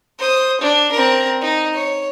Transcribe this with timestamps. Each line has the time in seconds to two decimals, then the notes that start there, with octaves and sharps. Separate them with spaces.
0.19 C5 D#6
0.61 D4
0.92 C4 A#4
1.41 D#4
1.74 C#5